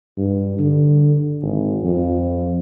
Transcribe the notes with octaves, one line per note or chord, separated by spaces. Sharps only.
G2
D3
G#1
F2